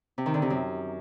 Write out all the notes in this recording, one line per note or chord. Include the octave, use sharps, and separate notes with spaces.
C3
D#3
D3
C3
F#2